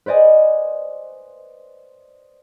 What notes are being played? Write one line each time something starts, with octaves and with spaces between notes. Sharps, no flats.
B4 C5 D5 D#5 G#5